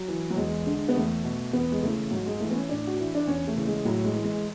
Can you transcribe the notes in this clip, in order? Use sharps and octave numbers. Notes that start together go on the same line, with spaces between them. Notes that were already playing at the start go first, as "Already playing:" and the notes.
Already playing: F#3
E3
F#3
E2 G#3
D3
B3
E2 A3
B2
E2 B3
G#3
C#3 E3 A3
G#2 F#3
G#3
E3 A3
B3
C#4
A2 D4
F#4
E3 E4
D4
E2 C#4
A3
C#3 E3
G#3
A2 F#3
G#3
E3
G#3